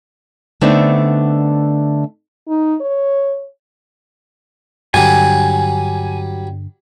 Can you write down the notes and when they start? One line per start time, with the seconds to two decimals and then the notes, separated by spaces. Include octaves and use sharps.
0.61 D3 A3 B3 C4 D4 D#4
2.48 D#4
2.81 C#5
4.94 G2 D3 F#3 G3 G#5